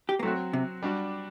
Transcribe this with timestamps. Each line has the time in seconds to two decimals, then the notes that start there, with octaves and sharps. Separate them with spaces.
0.09 G4
0.19 A#3
0.23 F#3 A3 C4 F#4
0.53 C3
0.82 G3 D4 F#4